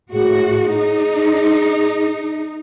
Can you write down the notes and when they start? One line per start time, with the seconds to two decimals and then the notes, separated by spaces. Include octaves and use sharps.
0.13 A2 F#4 G#4
0.70 D#4